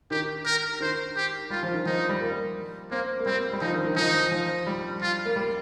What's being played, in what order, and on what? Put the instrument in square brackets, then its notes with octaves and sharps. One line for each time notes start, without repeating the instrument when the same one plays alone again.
[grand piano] D#3 [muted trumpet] G4
[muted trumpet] A#4
[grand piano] D#3 [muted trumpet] C5
[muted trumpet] G4
[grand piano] G3 [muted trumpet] F4
[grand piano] F3
D#3
[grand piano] F3 [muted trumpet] D#4
[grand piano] G3
A#3
[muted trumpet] A#3 [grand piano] C4
[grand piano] A#3
[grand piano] G3 [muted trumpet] C4
[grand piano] G3
[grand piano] F3 [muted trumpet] D#4
[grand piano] D#3
D#3
[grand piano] F3 [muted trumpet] D#4
[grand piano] F3
G3
[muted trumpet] F4
[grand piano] A#3
G3